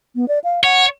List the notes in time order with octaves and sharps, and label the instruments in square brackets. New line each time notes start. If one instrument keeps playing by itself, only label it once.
[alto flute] B3
D5
F5
[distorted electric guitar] C#5 [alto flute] F#5